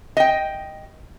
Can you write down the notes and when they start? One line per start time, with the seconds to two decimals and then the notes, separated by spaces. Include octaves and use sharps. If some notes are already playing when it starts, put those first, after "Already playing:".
0.17 D#5 G5